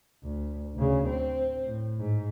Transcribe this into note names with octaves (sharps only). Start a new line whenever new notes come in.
D2
D2 C#3
C4
A2
G#2